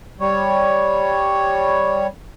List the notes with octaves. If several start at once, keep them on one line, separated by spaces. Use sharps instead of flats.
G3 C#5